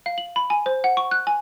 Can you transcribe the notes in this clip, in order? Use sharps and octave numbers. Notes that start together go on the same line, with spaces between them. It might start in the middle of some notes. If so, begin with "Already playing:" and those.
F5
F#7
B5
G#5
C5
F#5
C#6
F#6
G#5